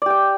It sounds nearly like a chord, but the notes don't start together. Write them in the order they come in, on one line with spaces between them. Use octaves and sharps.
D5 G4 G5